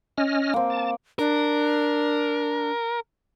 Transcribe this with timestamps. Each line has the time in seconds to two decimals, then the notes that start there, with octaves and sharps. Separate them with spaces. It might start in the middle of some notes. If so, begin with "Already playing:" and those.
0.18 C#4 D#5 F6
0.54 A#3 C4
0.70 A5
1.19 D4 A#4